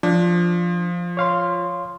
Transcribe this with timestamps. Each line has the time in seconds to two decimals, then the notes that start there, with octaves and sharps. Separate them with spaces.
0.03 F3 D4
1.17 C#5 F5 C6